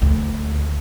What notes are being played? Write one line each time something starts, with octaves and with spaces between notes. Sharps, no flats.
D2